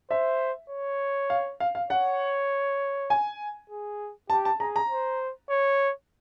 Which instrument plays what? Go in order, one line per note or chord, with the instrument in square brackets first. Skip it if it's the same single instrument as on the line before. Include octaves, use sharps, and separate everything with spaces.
[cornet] C5 [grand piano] E5
[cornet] C#5
[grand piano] F5
F5
F5
[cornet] C#5 [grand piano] F#5
[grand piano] G#5
[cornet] G#4
[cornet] G4 [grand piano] A5
[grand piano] A5
[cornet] G#4 [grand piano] A#5
[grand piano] A#5
[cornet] C5
C#5